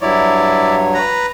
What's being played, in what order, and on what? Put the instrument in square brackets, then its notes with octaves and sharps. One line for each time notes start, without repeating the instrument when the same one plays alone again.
[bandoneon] G2 F#3 C#5 [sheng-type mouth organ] E4 D5
[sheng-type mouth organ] B4 A#5